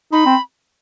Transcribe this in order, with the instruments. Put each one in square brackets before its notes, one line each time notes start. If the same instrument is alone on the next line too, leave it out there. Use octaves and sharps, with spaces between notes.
[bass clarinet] D#4 [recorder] B5
[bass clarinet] C4